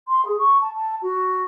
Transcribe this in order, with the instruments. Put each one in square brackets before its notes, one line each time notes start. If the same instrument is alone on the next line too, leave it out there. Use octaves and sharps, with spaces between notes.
[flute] C6
G#4
C#6
A5
A5
F#4